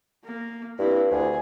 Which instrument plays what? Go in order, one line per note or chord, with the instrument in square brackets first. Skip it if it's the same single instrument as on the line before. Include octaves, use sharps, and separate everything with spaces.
[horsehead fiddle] A#3
[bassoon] G2 [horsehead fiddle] C4 E4
[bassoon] D2 [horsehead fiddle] G#4